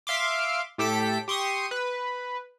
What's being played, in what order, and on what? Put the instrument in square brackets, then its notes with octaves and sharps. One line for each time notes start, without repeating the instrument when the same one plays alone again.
[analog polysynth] E5 F5 C6 D6
A2 G4 A4 B6 D7
G4 C6 C#6 D#6
B4